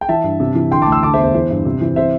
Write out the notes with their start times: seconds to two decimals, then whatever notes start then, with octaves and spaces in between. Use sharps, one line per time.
0.01 G5
0.09 E3 E5 A5
0.24 G2
0.40 C3
0.55 E3
0.71 D3 G5 C6
0.82 A5 D6
0.86 D2
0.92 C6 E6
1.03 D3 A5 D6
1.14 C5 E5
1.18 E2
1.24 C5
1.34 E3 C5
1.50 G2
1.65 C3
1.81 E3
1.96 C3 C5 E5